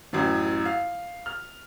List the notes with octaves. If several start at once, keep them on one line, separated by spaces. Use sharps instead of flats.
A1 F#2 E3
F5
F6